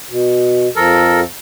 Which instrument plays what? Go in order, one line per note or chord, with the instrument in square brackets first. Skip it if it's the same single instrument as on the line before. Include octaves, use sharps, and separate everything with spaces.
[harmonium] B2
[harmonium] F2 F3 [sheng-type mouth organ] A4 A#4